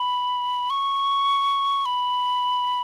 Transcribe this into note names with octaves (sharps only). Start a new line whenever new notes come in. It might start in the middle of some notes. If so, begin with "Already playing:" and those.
Already playing: B5
C#6
B5